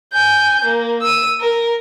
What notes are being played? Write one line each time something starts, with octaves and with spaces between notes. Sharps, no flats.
G#5 G6
A#3
E6 D#7
A#4